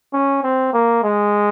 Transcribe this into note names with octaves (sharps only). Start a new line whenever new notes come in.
C#4
C4
A#3
G#3